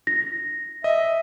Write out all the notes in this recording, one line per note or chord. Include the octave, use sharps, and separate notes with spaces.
A#6
D#5 E5